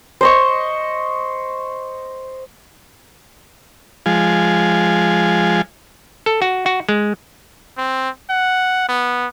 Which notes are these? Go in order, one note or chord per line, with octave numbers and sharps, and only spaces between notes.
C5 D#5 C#6
F3 G#3
A4
F#4
F#4
G#3
C4
F#5
B3